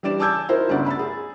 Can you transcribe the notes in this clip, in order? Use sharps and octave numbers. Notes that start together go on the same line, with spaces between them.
E3 G3 D4 D5 E7
G#5 A5 D6 E6 G6 G#6
D#4 E4 F#4 A#4 C5
G1 D2 C#3 D5 F#5
B5 E6 A6
G#4